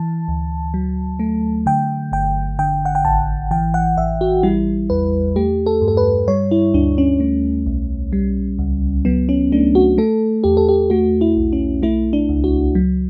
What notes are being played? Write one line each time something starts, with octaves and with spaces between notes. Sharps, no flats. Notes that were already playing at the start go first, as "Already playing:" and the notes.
Already playing: E3 A5
D2
F#3
A3
D3 G5
G1 G5
D3 G5
F#5
G5
A1 A5
E3 G5
F#5
A1 E5
F#4
G3 E4
E2 B4
A3 G4
A4
G2
A4
B4
G3 C#5
E4
D2 D4
C#4
A3
B1
G3
C#2
F#3 B3
C#4
A3 D4
F#4
A3 A4
E2 G4
A4
G4
A3 F#4
E4
B1
C#4
A3 E4
D4
C#2
F#4
F#3